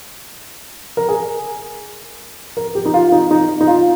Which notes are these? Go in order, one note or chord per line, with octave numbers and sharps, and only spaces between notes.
A#4
G#4
A#4
G4
D#4
F4
D#4
D#4
D#4
F4